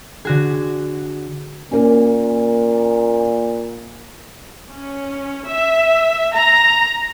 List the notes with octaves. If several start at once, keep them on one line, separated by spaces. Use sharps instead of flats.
D3 F#4 G#4
A#2 A#3 C#4
C#4
E5
A#5